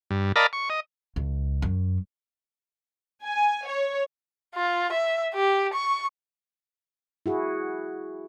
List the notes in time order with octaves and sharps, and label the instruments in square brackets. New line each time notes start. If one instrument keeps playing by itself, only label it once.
[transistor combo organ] G2
A#4 D5 D#5 F5 A5 B5
C#6
D#5
[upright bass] C#2
F#2
[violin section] G#5
C#5
[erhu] F4
E5
G4
C#6
[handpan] E4 F#4 G#4